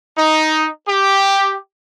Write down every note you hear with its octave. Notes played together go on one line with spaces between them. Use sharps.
D#4
G4